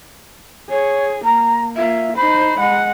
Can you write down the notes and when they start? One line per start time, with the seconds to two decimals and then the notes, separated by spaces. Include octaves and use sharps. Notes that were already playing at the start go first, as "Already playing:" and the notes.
0.70 G#4 C#5
1.24 A#3 A#5
1.76 A#3 F4 E5
2.16 D#4 C5 B5
2.59 G#3 F#5